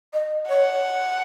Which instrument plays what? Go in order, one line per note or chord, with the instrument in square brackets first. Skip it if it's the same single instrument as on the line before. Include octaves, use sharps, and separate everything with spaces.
[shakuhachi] D#5
[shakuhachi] C#5 [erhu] F#5